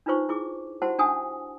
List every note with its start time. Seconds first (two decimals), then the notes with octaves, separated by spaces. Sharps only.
0.06 D4 D#4 F4 B4 C5 C#6
0.29 E4 G#4 D6
0.82 E4 F#4 G4 C5 F#5 A5
0.98 C#4 D4 F#5 G#5 A5 D#6